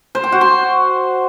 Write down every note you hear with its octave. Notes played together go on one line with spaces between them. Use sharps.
C5
G5
F#4
C6